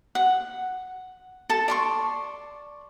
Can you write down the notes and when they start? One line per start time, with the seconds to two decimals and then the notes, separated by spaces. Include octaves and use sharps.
0.15 F#5
1.50 A4 A5
1.68 D5 C6 C#6